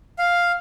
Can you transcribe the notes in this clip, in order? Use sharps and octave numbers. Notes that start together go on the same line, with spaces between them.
F5